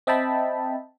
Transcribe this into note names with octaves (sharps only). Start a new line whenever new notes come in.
C4 D#5 E5 G5 A5 B5